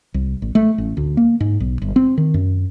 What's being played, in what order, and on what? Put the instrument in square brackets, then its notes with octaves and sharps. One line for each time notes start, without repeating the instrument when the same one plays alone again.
[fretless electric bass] C2
A1
A3
A1
D2
A#3
G#2
B1
G1
C4
D#3
F#2